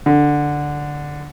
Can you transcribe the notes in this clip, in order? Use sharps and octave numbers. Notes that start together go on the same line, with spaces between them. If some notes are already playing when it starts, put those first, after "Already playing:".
D3